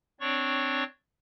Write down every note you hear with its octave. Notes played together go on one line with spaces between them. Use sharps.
C4 D4 C#5 D5 C#6